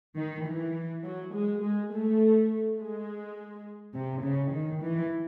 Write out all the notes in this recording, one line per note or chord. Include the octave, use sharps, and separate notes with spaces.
D#3
E3
F#3
G#3
G#3
A3
G#3
C3
C#3
D#3
E3